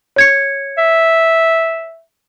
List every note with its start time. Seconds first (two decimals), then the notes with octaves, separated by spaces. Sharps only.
0.16 C#5 G#6 C#7
0.78 E5